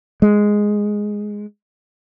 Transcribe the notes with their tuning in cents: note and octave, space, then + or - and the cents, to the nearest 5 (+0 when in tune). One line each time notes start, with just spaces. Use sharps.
G#3 +0